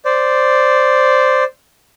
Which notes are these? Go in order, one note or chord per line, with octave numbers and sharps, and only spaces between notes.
C5 D5